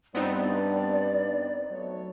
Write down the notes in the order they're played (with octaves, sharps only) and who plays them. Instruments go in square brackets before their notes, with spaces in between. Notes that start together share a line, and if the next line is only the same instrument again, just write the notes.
[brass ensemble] G2 [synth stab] B3 C4 D#4 [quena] D5
[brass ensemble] F#3 A3 C#5